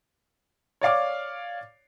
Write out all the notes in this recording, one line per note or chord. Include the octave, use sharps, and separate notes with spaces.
C#5 D5 F5 D6